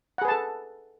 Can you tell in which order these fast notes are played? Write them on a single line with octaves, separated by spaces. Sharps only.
F#5 G#4 B4 A5 A4